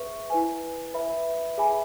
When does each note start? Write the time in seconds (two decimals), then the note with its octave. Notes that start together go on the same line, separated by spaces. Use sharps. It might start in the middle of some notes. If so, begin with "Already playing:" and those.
Already playing: G#4 B4 E5 C#6
0.30 E4 B4 G#5
0.94 B4 E5 B5
1.58 G#4 E5 G#5 B5